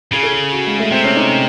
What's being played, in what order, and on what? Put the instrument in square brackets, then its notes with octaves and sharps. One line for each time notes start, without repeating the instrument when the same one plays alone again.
[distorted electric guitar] C#3 [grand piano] G#4
[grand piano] A4
G#4
F#4
G#3
A3
[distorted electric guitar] C3 [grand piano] C4
[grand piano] C#4
D#4